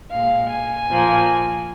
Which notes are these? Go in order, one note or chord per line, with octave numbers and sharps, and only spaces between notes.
A#2 G#3 F5
G#5
A#2 F3 A#3